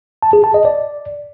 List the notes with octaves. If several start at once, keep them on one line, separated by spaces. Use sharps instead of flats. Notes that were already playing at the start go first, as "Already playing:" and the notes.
A5
G#4
A5
D#5
D5